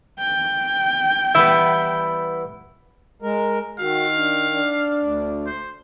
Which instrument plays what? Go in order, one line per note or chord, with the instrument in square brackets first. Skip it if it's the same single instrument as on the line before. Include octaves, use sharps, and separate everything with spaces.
[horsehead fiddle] G5
[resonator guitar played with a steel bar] E3 G3 B3 [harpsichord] E4
[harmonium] G#3 A#4
[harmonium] D#3 [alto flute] F#4 [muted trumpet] F5
[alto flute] D4
D4
[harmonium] D2
[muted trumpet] C5